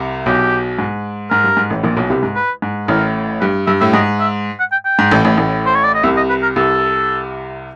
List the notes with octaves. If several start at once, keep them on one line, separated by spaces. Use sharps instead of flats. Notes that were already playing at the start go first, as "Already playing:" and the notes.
Already playing: C2 C3
B1 B2 G4
G#2
G#2 A#4
G2
G#2
A1 A2
A#1 A#2
B1 B2
C2 C3
G#2
B4
G#2
A1 A2 A#4
G2 B4
G2 E5
A2 E5
G#2 D#5
E5
F#5
G5
G5
G#2
A1 A2
A1 A2
A1 A2
C5
C#5
D5
D#5
C2 C3 E5
D#5
B4
A#4
C2 C3 A4